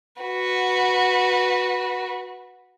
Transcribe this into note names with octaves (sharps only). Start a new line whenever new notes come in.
F#4 B4